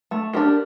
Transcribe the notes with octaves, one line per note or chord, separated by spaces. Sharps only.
A3
D4 G4 A#4